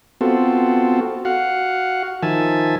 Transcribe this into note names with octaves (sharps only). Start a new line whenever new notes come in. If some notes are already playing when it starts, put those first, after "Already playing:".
B3 C4 F4 F#4 A4
F#4 F5 F#5
D#3 F3 E5 G#5 A5